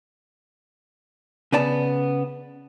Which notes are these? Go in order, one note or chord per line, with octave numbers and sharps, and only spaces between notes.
C#3 B3 D5 A5